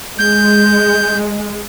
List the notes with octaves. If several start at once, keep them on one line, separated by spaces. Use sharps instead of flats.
G#3 G6